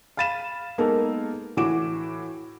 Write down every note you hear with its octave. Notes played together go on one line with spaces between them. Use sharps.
F5 B5 A6 D#7 E7
G#3 A#3 B3 D#4 A4 A#4
A2 E3 F#4 D6 D7 E7